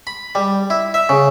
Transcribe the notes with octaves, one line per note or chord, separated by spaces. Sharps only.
B5
G3
E4
E5
C#3